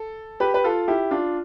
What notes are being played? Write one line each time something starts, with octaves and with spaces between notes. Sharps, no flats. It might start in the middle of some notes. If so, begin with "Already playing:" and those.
Already playing: A4
G4 B4
B4
F4 A4
E4 G4
D4 F4